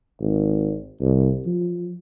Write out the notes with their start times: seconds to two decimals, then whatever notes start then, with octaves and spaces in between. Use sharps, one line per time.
0.21 G#1
1.01 C2
1.46 F3